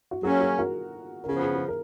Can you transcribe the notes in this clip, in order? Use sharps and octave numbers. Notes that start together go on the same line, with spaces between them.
F#4
F#3 A#3 C#4 G#4
G#4
F#4 A#4
A#4
C#3 F3 B3 G#4
G#4
G#4
A#4